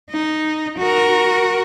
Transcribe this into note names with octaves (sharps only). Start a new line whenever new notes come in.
D#4
F#4 A#4